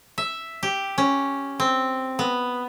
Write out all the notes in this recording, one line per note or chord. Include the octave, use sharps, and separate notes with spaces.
E5
G4
C#4
C4
B3